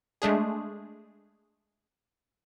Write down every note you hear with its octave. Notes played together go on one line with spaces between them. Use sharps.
G#3 A3 D4 G#4